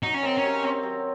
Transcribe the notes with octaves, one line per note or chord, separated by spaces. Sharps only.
F#3 D#4
C#4
D#3 C4
C#4
C3
C4
F#3